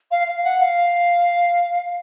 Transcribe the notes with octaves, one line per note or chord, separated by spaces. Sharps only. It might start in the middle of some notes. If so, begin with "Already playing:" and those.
F5
F5
F#5
F5